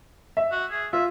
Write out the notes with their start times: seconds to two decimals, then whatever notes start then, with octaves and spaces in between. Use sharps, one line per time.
0.37 E5
0.52 F#4
0.71 G#4
0.93 F4 E5